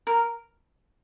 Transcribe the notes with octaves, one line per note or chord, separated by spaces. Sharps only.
A#4